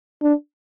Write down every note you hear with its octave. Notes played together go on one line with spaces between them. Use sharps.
D4